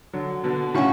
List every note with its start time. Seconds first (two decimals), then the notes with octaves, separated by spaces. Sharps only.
0.13 D3 F#3
0.44 B2 D3
0.75 A2 C#3 F#3 C#4 F#4